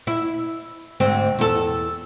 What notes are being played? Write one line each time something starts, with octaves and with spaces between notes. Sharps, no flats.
E4
D2 G#2 C4
E2 A4